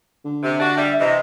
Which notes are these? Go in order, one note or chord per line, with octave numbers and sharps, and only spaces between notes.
D3
C3
D4 F#4
G3 E5
C3 E3 D#5